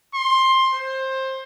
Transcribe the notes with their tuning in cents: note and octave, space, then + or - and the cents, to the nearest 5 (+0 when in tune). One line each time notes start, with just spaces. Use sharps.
C6 +15
C5 +20